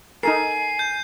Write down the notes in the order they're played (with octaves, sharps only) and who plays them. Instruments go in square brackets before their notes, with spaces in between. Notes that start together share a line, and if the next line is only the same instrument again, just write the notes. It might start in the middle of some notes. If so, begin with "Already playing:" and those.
[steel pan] D#4 A4 A#4 [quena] G#5 [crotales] C7
[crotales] G6